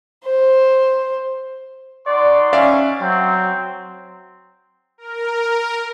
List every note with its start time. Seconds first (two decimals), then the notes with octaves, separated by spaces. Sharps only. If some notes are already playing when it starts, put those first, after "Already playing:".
0.25 C5
2.07 D#4 F#4 D5 C6
2.53 C#4 D5 E5 F5
3.01 F#3 C4
4.98 A#4